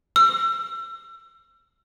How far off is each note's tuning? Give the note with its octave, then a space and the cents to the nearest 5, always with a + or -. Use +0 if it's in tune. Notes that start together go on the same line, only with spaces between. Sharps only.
E6 +35